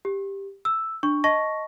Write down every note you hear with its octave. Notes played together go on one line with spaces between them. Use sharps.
G4
E6
D4 C#6
D#5 A5 C#6 A#6